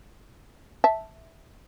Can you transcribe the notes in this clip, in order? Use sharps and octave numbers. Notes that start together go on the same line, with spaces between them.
E5 A5